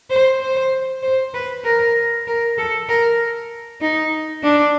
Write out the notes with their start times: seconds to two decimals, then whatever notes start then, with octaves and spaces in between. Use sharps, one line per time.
0.10 C5
0.41 C5
1.03 C5
1.34 B4
1.64 A#4
2.27 A#4
2.58 A4
2.89 A#4
3.81 D#4
4.43 D4